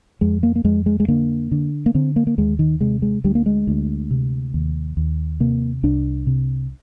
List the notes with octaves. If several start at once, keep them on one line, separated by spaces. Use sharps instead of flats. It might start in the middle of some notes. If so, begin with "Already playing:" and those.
F2 G#3
A#3
A#3
F2 G#3
G#3
G#3
D3 A#3
D3
A#3
D3 C4
A#3
A#3
D#2 G#3
D#3
C3 G#3
G#3
D2 G3
A#3
G#3
D2
C3
D#2
D#2
C3 A#3
C2 D4
C3